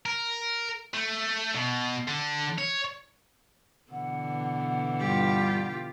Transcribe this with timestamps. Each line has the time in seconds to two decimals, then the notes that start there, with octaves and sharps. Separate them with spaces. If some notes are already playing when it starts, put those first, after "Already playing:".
0.06 A#4
0.94 A3
1.54 B2
2.07 D3
2.58 C#5
3.91 B2 D3 E3 F#5
5.00 G2 G3 F4 G4